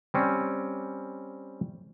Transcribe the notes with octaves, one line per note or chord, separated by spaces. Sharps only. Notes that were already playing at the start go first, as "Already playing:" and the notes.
G3 C4 C#4